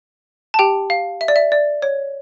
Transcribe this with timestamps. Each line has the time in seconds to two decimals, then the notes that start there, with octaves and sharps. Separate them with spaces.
0.54 A5
0.59 G4 G5
0.90 F5
1.21 E5
1.28 D5
1.36 E5
1.52 D5
1.82 C#5